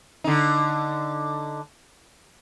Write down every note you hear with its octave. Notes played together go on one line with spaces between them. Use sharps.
D3 D#4